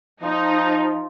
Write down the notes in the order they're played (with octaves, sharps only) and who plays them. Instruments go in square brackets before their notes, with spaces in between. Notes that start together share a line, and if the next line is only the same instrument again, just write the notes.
[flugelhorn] F3 [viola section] D#4 [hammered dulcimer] F4